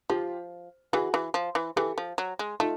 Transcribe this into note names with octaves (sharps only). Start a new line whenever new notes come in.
F3 F4 G4
E3 F#4 G#4
E3
F3
E3
E3 G4 A4
F3
F#3
G#3
A3 D#4 F4